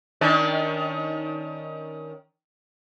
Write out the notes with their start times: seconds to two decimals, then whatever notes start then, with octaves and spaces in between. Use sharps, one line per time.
0.21 D#3 C#4 D4